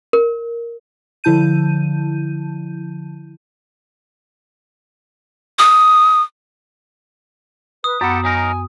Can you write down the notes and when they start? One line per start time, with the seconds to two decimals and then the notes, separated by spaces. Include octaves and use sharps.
0.13 A#4
1.24 D3 F3 E4 A5 G6 D#7
5.59 D#6
7.84 B4 D#6
8.01 F#2 B3 G4 A4 F#5 B5
8.24 F#3 D#4 A#4 G#5